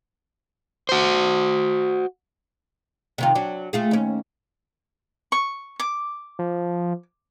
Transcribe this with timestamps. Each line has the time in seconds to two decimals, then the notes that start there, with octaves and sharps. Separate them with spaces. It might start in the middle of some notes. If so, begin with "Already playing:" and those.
0.89 F#4 C5
3.18 C3 D#3 F4
3.35 F#3 D4
3.73 A3 F4 G#4
3.91 D#2 C#4
5.32 C#6
5.80 D6
6.39 F3